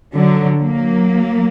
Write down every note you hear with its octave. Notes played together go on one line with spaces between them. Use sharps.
D3 F#3
F#3 A#3